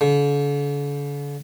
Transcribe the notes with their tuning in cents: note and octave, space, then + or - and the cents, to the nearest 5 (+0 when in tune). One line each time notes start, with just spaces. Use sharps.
D3 -45